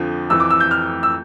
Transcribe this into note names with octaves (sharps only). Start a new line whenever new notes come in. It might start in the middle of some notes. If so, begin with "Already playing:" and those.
Already playing: F2 D3 F3
F2 E3 E6
D6
E6
G6
F6
E6